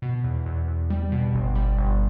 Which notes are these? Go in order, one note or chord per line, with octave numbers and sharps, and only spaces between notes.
B2
E2
E2
E2
G3
B2
G1
G3
G1